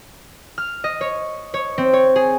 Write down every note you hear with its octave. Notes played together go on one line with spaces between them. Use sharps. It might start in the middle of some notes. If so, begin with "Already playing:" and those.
F6
D#5
C#5
C#5
C4
C#5
G#4